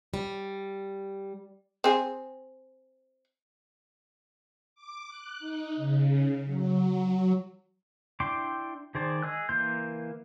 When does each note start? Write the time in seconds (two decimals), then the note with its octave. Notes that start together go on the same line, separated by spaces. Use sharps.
0.14 G3
1.84 C4 G#4
4.75 D6
5.08 F#6
5.39 D#4
5.76 C#3
6.45 F#3
8.20 D4 E4 G5 C6 D6
8.95 D#3 G#4 C5 D5 A5
9.22 G#4 D#5 G#5 E6 F#6
9.49 E3 A#3 A#4 C6 G6